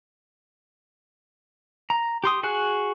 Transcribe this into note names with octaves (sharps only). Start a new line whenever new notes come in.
A#5
G4 C6 D#6
F#4 G#4 G#5 F#6